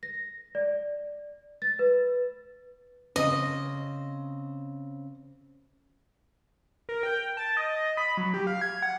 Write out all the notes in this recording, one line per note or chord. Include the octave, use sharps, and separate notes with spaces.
A#6
D5
A6
B4
C#3 C4 D#5
A#4
G5
A5
D#5
B5
F#3
G4
F5
G#6
F#5